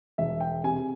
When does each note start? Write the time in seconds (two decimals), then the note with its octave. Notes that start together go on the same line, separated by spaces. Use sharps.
0.18 E1 E5
0.40 G5
0.64 C3 G#5